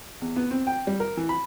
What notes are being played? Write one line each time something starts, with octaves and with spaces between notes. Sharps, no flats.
E2
B3
C4
G5
G3
A#4
E3
B5